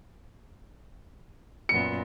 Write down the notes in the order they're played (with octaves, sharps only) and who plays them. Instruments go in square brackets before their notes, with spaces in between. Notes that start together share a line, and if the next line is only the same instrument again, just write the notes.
[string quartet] F#2 A#2 B3 [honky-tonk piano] C#7